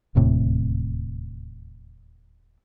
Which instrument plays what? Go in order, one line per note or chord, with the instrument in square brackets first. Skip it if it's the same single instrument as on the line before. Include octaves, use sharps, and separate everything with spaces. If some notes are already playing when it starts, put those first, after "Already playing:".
[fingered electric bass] D1 D#2 A2 C3